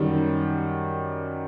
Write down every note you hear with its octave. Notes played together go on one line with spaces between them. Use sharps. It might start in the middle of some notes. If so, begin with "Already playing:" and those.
Already playing: F#2 D#3 G3